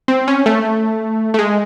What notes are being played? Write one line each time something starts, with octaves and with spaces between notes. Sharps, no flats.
C4
C#4
A3
A3
G#3